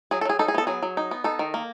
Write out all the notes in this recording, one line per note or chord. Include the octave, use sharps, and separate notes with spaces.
F#3 G#4
A4
F#3 G#4
D#4 A4
G#4
B3 A4
F#3 G#4
F#3
D#4
B3
D#4 A4
D#3
A#3